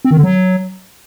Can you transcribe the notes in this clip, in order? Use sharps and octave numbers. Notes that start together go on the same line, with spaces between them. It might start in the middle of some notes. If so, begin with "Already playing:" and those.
C4
D#3
D3
F#3